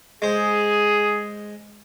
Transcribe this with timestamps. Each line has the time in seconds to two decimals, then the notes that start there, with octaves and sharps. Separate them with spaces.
0.22 G#3 G#4 C5